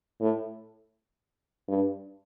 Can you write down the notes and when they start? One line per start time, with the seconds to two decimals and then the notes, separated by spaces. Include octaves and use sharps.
0.20 A2
1.68 G2